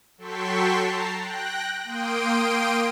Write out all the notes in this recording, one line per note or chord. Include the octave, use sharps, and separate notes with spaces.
F#3 A4 G5 C6 C#6 B6
A5 A#5 C7
G5 F#6 A#6
A#3 G5 C6 D#6 D7